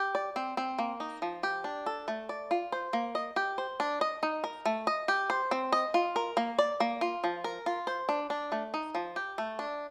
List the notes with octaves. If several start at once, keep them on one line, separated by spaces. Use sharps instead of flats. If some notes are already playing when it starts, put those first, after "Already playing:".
Already playing: G4
D5
C4
C4
A#3
D#4
F3
G4
D4
A4
A3
D5
F4
C5
A#3
D#5
G4
C5
D4
D#5
D#4
A#4
A3
D#5
G4
C5
C4
D#5
F4
A#4
A#3
D5
A#3
F4
F3
A#4
F4
C5
D4
D4
A3
D#4
F3
G4
A3
D4